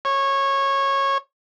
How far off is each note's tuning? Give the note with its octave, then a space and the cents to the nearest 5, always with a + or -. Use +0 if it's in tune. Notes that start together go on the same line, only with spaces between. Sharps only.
C#5 -20